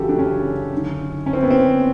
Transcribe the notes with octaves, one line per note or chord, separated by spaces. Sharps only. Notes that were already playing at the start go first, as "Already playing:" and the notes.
Already playing: F#2 C#3 E3 F#4 G4 A4
D4
C#4
F#2 D3
C#4
C4
B3
C4